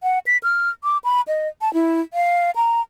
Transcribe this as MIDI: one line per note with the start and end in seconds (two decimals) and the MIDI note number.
0.03 0.19 78
0.26 0.37 95
0.43 0.69 89
0.84 0.98 86
1.04 1.21 83
1.28 1.48 75
1.61 1.72 81
1.73 2.01 64
2.13 2.51 77
2.56 2.81 82